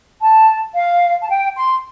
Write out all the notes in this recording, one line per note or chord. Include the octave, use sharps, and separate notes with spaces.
A5
F5
A5
G5
C6